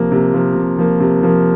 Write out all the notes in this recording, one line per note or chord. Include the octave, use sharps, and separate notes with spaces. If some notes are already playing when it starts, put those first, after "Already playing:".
Already playing: C3 F3 A#3
C3
F3 A#3
C3
F3 A#3
C3
F3 A#3